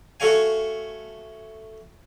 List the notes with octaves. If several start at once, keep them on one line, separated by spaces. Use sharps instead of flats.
A3 F#4 A4 C#5 F5 G#5